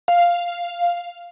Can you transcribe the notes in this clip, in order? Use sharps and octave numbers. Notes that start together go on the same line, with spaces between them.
F5